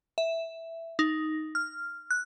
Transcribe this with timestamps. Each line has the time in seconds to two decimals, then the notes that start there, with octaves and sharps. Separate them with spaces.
0.18 E5
0.99 D#4
1.55 F6
2.11 F#6